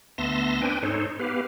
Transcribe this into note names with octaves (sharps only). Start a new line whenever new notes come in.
D2 B3 E5 A5 C6 A#6
C4 D4 B4 G5 G#5
G#2 D#4 A4 C5 C#5
B3 G4 B4 F5